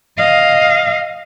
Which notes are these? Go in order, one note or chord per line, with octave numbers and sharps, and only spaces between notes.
D#5 F5